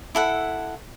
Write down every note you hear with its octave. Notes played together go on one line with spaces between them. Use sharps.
E4 A4 F#5